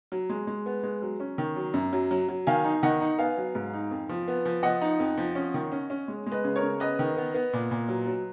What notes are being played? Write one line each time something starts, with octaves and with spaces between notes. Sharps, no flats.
F#3
G#3
G#3
B3
G#3
F#3
C#4
D#3
F#3
F#2
F#3
F#3
F#3
D#3 F5 G#5
D#4
D#3 D#5 F#5
D#4
B3 F5 G#5
F#3
G#2
D#4
F2
F3
B3
F3
F3 D#5 F#5
D#4
F2
F3
C#4
D#3
C#4
C#4
G#3
G#3
B4 D#5
C#3
A#4 C#5
C#3
B3 B4 D#5
D#3
B3
B3
A#2
A#2
F#3
F#3